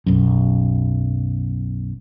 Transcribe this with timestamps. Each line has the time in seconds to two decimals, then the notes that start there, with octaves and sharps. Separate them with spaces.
0.06 B1 F#2